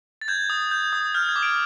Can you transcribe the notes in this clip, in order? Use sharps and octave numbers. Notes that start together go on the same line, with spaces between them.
A6
G6 G#6
D#6
G6
D#6
F6 G6
G#6
D6
D7